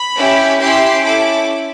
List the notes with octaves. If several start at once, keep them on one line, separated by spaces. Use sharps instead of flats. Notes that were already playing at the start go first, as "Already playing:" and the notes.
Already playing: B5
C#4 E4 G4
C#4 E4 G4 C6
C#4 E4 A4 D6